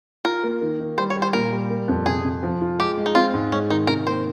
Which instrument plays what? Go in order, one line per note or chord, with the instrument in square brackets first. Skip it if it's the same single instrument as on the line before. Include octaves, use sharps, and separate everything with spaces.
[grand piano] F4 [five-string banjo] A#4
[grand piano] A#3
D#3
D#3
[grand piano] G3 [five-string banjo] C5
[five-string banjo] C#5
[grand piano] G3
[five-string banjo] C5
[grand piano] A#2 [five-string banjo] A#4
[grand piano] G3
A#3
F2
[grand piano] C3 [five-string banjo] G#4
[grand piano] C3
F3
F4
[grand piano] G#3 [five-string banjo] G4
[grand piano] G#3
[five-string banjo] D#4
[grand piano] C4 [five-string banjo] F4
[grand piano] G#2
[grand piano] G#3 [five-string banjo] C#4
[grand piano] D#3 [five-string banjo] D#4
[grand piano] C3 [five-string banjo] A#4
[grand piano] A#3 [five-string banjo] C5